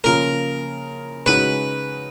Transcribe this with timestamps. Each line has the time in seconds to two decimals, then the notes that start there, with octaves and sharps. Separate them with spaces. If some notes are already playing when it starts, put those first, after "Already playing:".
0.04 C#3 F3 A#3 F4 A#4
1.26 C#3 G#3 D#4 F#4 B4